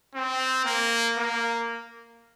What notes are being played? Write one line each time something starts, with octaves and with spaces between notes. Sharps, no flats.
C4
A#3
A#3